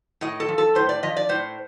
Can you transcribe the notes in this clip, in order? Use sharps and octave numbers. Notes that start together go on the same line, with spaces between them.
A2 D#5
A4
F3
A4
A2 C5
D5
F3 D#5
D5
A2 C5